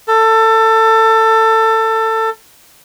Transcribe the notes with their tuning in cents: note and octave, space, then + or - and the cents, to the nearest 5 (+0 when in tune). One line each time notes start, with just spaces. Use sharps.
A4 +20